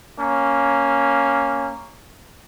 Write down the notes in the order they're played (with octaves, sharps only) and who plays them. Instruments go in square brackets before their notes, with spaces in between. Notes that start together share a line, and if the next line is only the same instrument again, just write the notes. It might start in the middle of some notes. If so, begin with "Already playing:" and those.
[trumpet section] A#3 C#4